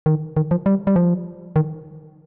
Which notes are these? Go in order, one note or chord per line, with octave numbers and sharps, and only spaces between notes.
D#3
D#3
F3
G3
G3
F3
D#3